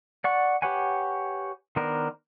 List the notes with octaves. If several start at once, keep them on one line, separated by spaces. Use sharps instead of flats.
D5 F#5 C#6
G4 B4 C#5 F#5 G#5
D#3 B3 D4 A#4 C5